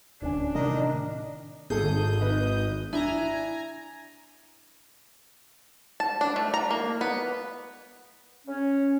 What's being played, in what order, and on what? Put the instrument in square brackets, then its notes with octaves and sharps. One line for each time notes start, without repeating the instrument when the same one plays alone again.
[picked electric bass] D1 C#4 [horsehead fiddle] D4
[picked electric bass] A2 C3 D#3 [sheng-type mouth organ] D#4 A#4 D#5
[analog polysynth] G#1 D#6 G6 [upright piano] G#4 A4
[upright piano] D#4 B4
[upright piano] D4 E4 [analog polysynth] G#5 A#5
[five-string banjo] A5
D4
A3
A#5
A#3
B3
[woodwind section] C#4